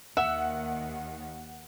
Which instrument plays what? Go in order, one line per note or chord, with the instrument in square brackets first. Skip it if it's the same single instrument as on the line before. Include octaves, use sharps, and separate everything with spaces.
[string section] D#2 D#3 [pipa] E5 [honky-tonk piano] F#5